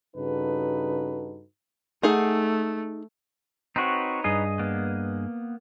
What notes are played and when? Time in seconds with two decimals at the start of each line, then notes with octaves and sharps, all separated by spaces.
0.16 G2 C#3 D#4 F#4 A4 B4
2.03 A3 D#4 G#4 F#5
3.76 C4 D#4 F#4 B4 C#5
4.24 G2 G#4 D#5
4.59 A#3 B3